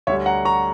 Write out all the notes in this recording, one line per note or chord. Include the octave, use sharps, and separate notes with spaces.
D2 D3 G3 C#5 E5
F#5 A#5
A#5 C#6